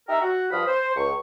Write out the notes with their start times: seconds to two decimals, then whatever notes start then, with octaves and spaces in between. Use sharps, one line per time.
0.09 D#4 G4 A#4 E5
0.21 F#4
0.51 G2 F3 B5 D#6 F6
0.68 C5
0.96 C#2 C#6